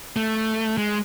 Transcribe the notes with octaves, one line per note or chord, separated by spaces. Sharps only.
A3
G#3